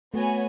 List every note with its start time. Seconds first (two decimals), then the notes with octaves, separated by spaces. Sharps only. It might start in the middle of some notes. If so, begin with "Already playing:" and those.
0.14 A3 B3 F#4 C#5 G#5